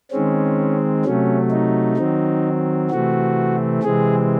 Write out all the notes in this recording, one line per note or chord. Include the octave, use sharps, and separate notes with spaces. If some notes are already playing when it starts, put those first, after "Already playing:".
D#3 G#3 C4 C#4
C3 F#3 A3 C#4
D#4
D#3 F#3 C4
C3 E3 A3 C4 F#4
C3 E3 G#3 C4 G#4